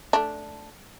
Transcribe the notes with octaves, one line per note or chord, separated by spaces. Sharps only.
A3 D4